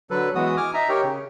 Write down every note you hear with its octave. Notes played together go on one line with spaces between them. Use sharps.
D3 F#3 A4 B4
E3 G#3 B3 F#4 D#6
G#5 D6 F6
D#4 E5 A#5
G4 A#4 C#5 G5
C#3